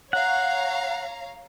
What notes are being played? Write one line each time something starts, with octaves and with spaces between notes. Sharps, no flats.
C#5 F5 F#5 A#5